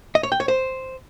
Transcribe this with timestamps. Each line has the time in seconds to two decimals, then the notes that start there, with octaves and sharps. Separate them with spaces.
0.15 D#5
0.23 C#5
0.32 G5
0.40 C#5
0.48 C5